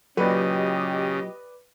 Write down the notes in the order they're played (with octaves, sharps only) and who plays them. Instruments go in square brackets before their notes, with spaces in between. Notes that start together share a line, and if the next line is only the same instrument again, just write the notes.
[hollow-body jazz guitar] A#2 F#3 [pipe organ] C#3 [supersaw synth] G4 D#5 [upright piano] B4 D5